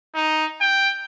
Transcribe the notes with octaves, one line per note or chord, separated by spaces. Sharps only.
D#4
G5